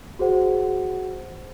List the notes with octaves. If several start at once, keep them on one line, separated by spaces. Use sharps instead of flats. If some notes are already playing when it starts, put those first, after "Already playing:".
F#4 G#4 C5 F#5